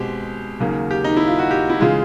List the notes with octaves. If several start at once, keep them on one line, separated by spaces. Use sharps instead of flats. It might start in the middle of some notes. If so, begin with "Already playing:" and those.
Already playing: B2 G#3 C4 G4
D#2 C#3 F#3 A#3
G4
D#4
E4
F4
F#4
G4
E4
C#3 E3 G#3 F4